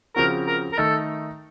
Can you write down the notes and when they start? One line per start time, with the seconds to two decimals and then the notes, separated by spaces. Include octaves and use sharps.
0.16 C#3 F3 C4 F#4 A#4
0.47 A#4
0.73 A#4
0.77 D#3 A3 D#4 A4